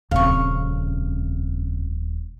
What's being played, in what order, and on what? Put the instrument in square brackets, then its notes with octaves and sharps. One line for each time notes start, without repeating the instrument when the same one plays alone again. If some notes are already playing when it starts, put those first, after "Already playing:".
[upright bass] D#1 C4 [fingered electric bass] F2 C#3 [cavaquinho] F5 C#6